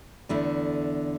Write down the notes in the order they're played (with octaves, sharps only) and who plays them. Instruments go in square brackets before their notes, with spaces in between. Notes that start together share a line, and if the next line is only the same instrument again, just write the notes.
[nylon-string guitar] E2 D3 A3 E4